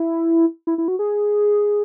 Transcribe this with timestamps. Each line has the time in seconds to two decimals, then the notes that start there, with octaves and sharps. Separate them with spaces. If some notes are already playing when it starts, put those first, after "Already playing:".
Already playing: E4
0.67 E4
0.78 E4
0.88 F#4
0.99 G#4